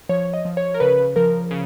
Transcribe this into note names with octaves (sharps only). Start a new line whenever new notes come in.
F3 C#5
D#5
F3
C#5
A#4
C#3 B4
F3 A#4
C#3